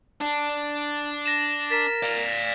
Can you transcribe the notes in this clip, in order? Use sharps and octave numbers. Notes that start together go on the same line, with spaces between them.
D4 A5
A#6 E7
A#4 A6 B6 E7
D5 F5